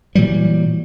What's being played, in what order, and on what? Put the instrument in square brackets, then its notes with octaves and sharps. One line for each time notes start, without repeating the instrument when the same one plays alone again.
[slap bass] A#2 E3 F#3 G3